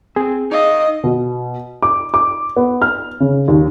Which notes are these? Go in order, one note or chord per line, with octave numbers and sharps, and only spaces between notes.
C4 G#4
D#4 D#5 F5
B2
D6
D6
B3
F6
C#3
D#2